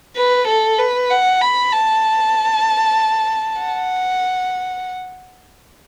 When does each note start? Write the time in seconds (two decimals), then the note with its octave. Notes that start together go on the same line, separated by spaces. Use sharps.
0.16 B4
0.47 A4
0.78 B4
1.10 F#5
1.41 B5
1.73 A5
3.61 F#5